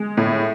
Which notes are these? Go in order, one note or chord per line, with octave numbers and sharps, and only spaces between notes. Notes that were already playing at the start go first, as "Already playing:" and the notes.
Already playing: G#3
A2